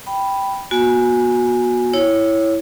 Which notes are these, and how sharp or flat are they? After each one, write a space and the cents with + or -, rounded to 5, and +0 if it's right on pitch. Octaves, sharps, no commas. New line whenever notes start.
G5 +0 B5 +0
B3 -35 F#4 -20 G#5 +0
E4 +0 C#5 +0